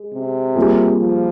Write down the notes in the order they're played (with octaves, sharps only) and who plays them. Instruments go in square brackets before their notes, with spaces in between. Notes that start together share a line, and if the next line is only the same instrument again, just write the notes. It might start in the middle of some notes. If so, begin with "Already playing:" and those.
Already playing: [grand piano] G#3
[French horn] C3
[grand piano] G3 A#3 F4 G#4
[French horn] F3